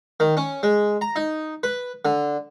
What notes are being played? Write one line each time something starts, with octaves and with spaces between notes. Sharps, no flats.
D#3
C#4
G#3
A#5
D#4
B4
D3